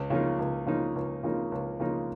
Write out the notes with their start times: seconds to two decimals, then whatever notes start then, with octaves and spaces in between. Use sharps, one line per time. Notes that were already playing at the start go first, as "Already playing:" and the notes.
Already playing: C#2
0.10 C#3 F3 A#3 D#4
0.39 C#2
0.67 C#3 F3 A#3 D#4
0.95 C#2
1.23 C#3 F3 A#3 D#4
1.52 C#2
1.80 C#3 F3 A#3 D#4